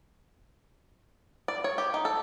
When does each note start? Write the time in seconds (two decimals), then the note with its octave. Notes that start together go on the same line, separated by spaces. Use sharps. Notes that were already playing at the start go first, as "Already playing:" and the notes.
1.48 D5
1.64 C#5
1.78 G4
1.94 D#4
2.05 A4